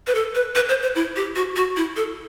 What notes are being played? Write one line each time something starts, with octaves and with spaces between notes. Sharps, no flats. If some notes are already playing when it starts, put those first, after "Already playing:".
B4
A4
B4
B4
C5
C5
E4
G4
F#4
F#4
E4
A4